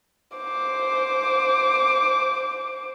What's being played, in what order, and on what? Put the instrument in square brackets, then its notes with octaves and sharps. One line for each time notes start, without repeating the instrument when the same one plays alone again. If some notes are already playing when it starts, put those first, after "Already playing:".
[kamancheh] C5 D6